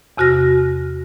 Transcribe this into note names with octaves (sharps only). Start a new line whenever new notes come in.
E2 C3 F#4 F6 A#6